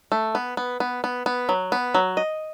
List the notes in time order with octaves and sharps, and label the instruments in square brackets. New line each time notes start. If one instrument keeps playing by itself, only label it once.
[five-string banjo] A3
B3
B3
B3
B3
B3
F#3
B3
F#3
D#5